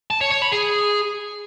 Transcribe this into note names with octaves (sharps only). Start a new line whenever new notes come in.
A5
C#5
C#5
B5
G#4